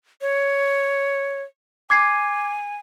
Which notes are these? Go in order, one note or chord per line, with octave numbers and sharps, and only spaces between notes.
C#5
G#5 D6 G#6 C7